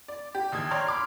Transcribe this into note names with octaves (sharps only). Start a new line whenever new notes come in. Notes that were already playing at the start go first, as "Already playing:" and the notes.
D5
G4
A#1 D#2 D#6 G#6
C#5 D5 G5 A#5 C6 F6
B5 C6 D6 F6